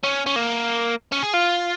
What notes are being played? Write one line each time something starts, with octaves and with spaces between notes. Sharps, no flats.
C#4
C#4
A#3
C#4
G#4
F4